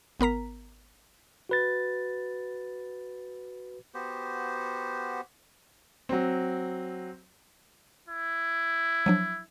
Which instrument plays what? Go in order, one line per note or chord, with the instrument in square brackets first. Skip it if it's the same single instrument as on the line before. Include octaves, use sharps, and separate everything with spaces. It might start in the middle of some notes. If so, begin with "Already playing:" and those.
[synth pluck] G#1 B3 A#4 A#5 B6
[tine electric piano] F#4 B4 A6
[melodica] B3 F#4 G4 C5
[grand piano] F#3 C4
[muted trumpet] E4
[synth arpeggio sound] F3 F#3 D4